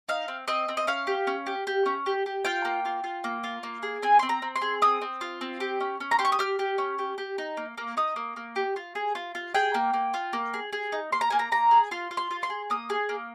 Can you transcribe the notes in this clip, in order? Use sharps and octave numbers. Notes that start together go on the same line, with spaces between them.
D#4 F5
C4
C4 D#5
C4
D#5
C#4 F5
G4
C#4
G4
G4
C#4
G4
G4
F4 G5
A#3
F4
F4
A#3
F4
A#3
G#4
C4 G#5
C4 C6
A#5
C4
C6
G#4
C4 D#6
C4
F4
C4
G4
C#4
C#4
A#5
G4 C6
C#6
D#6
G4 F6
G4
C#4
G4
G4
D#4
A#3
A#3
D#4 D#6
A#3
A#3
G4
F4
G#4
F4
F4
G#4 G5
A#3
A#3
F4
A#3
G#4
G#4
D#4
A#3 C6
A#5
A#3 G#5
A#5
A#3 A#5
G#4
F4 C6
F4
C6
F4
C6
G#4
A#3 D#6
G#4
A#3